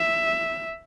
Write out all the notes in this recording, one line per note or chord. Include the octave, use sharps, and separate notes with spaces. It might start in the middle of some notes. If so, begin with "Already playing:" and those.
Already playing: E5